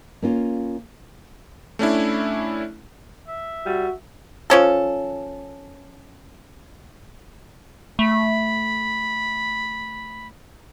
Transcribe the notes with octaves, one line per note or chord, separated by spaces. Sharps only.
A#3 C#4 F4
A3 C#4 D4 E4
E5
G3 F#4
F3 C#4 A4
A3 B5